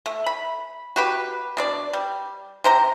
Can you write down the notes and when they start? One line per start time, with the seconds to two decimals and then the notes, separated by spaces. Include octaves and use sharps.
0.06 A3
0.26 B5
0.96 F#4 G4 B4
1.57 B2 D4 D5
1.93 G3
2.64 C3 C5 A#5